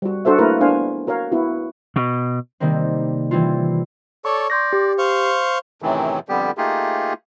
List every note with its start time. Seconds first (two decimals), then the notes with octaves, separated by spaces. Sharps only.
0.02 G3 F#4
0.25 D4 F#4 A4 C5 E5
0.38 A3 A#3 E4 F#4 A#4 B4
0.61 B3 D4 C5 F5 G#5
1.07 F#4 A#4 C#5 F5
1.32 B3 E4 F#4
1.96 B2
2.60 C3 D#3 G3 A#3 C4
3.31 E3 G3 C4 E4 F4
4.25 A4 C#5 D5 C#6
4.50 D5 C6 G6 A#6
4.73 G4
4.98 C5 F5 C#6
5.82 F#2 A2 C3 D#3 E3 F#3
6.29 F2 D3 G3 B3 G4
6.57 A3 A#3 D#4 F4 G4 G#4